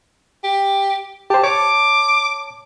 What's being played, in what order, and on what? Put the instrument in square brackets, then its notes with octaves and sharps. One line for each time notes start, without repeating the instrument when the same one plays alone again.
[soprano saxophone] G4
[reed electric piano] G4 C5 [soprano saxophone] A5
[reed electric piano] C#5 A5 [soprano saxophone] D6